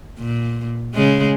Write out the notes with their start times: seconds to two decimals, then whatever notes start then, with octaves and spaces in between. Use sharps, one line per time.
0.19 A#2
0.94 C#3 G#3